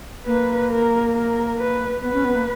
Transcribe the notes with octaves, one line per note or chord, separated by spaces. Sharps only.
A#3 B4
A#4
A#4
B4
B3 B4
C#4
B3
A#3